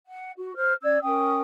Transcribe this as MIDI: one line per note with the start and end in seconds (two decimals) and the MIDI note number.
0.04 0.29 78
0.36 0.53 66
0.56 0.73 72
0.56 0.73 89
0.83 0.98 61
0.83 0.98 74
0.83 0.98 88
0.83 0.98 92
1.02 1.41 61
1.02 1.41 70
1.02 1.41 79
1.02 1.41 87